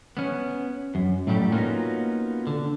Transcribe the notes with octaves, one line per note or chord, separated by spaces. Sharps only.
B3 C#4
F#2
A2 F#3 G3 A3 G4
A#3 B3 C#4 D#4 F4 F#4
D3